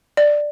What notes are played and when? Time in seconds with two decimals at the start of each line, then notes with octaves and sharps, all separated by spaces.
0.17 D5